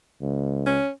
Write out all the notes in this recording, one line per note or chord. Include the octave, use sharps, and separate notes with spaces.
C#2
C#4